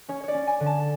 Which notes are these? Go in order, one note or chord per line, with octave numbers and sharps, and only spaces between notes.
C#4 C#5
C#5 D5
C#4
G#5
D3
A5